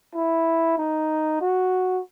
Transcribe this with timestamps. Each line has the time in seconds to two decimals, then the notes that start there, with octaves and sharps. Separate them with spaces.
0.15 E4
0.78 D#4
1.41 F#4